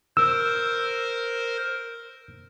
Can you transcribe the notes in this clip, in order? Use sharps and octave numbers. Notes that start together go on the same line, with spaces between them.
A#4 C5 E6